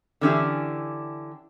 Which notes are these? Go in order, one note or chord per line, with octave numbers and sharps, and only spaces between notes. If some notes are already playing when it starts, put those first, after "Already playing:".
D3 E3 C#4 D4 E4 G4